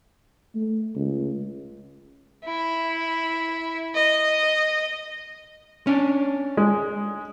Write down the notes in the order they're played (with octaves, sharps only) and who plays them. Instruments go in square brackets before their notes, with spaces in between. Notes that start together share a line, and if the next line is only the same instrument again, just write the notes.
[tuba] A3
C#2
[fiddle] E4
D#5
[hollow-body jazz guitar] C#4 D4
[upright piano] G#3